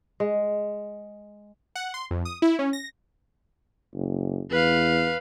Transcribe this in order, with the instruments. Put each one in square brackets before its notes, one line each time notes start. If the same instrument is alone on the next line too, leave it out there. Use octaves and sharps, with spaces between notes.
[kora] G#3
[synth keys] F#5
C6
F2
D#6
E4
C#4
A#6
[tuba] F#1
[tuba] E2 [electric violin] B4 F5